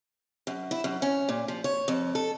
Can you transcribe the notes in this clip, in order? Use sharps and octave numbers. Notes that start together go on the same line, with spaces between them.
F#2
E4
F#2
C#4
A#2
F3
C#5
F2
A4